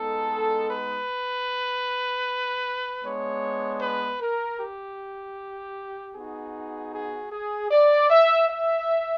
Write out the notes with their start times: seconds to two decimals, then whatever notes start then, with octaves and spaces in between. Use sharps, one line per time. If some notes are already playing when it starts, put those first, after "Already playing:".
Already playing: G#3 B3 D#4 A4
0.69 B4
3.03 G#3 B3 D4 C#5
3.81 B4
4.21 A#4
4.59 G4
6.14 B3 D#4 F#4 G#4
6.92 G#4
7.31 G#4
7.69 D5
8.09 E5
8.48 E5